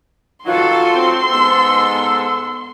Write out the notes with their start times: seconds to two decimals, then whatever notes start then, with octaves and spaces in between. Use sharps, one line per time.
0.46 D#3 F#3 B3 F4 F#4 A4 C6
0.94 C4
1.30 G#2 B3 A4 E6